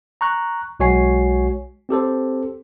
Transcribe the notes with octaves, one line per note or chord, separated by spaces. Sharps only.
A#5 C#6 F#6
B1 G#3 F#4 C#5 G#5 C7
C4 G4 A4 C5